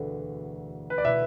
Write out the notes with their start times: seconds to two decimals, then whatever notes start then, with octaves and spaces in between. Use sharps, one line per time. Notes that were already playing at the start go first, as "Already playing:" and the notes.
Already playing: E1 D2 D3 B3
0.90 B4
0.98 D5
1.04 B2 A3 E4 B4 E5